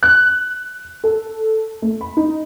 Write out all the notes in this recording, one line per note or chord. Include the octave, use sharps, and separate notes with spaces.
F#6
A4
A3
B5
D#4